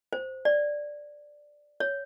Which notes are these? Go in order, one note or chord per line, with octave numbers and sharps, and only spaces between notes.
C5
D5
C#5